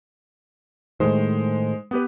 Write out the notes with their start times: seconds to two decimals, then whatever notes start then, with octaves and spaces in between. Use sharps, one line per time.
1.00 A2 D#3 G#3 C5
1.91 B3 G4 B4